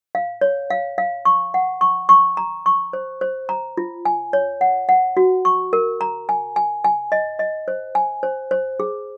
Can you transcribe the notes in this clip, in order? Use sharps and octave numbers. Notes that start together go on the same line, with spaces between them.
F5
C#5
F5
F5
C#6
F#5
C#6
C#6
A#5
C#6
C5
C5
A#5
F4
G#5
C#5
F#5
F#5
F#4
C#6
A#4
A#5
G#5
G#5
G#5
D#5
D#5
C5
G#5
C5
C5
G#4